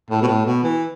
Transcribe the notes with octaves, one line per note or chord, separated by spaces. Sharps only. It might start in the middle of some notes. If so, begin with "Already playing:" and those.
A2
B2
A2
B2
E3